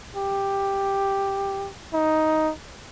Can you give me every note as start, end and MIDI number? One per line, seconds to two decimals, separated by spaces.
0.16 1.69 67
1.93 2.52 63